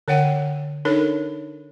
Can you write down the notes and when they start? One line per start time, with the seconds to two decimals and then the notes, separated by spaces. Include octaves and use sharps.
0.08 D3 C#5 F#5 G5
0.85 D4 D#4 A4 A#4 C#5